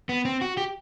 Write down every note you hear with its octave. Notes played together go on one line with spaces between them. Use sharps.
B3
C4
F#4
G4